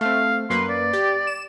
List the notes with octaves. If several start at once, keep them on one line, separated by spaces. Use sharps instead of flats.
A3 C4 F5
F#2 A#3 B4 C6
D5
G4
E7